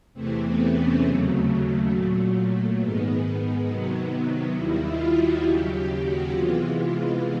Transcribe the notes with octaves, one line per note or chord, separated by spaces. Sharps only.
E2 C3 E3 A3 C4
B3
C#4
D#2 C#3 F#3 A3
A#2 F#3 A3
G#2 D#3 G#3 B3
C3 D#3 F#3
D#2 D#3 G3 E4
F4
F#4
D#2 C#3 F#3 G4
G4
F#4
C3 E3 G#3 B3 F4
F4
F4